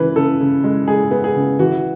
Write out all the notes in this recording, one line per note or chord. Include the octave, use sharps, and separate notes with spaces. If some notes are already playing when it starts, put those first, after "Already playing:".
Already playing: C#3 E3 G#3 B4
C#3 A4
C#3
G#3
G#3 G#4
B3
G#4
C#3
E3 F#4